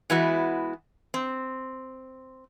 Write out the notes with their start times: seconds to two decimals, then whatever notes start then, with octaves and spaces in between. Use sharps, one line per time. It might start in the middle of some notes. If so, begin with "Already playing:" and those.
0.10 E3 G#3 B3 E4 F#4
1.14 C4